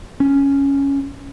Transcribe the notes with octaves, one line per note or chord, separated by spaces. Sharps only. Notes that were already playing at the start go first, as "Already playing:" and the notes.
C#4